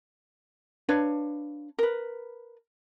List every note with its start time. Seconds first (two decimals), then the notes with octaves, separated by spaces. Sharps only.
0.89 D4 B4 C#5 F5
1.79 A#4 B4